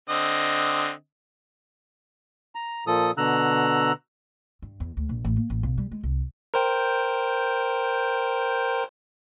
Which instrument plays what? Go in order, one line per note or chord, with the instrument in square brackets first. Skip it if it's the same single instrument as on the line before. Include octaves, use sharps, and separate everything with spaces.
[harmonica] D3 C4 D#5
[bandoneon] A#5
A#2 F3 A4 D#6
B2 D3 A#5 E6 F#6
[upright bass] G2
E2
D2
A#1
A1
A#3
A1
B1
G3
G#3
C2
[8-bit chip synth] A#4 C5 G5